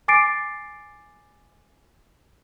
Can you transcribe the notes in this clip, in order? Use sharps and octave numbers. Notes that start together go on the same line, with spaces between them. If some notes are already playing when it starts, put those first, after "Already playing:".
G#5 D6 A6 C7 D7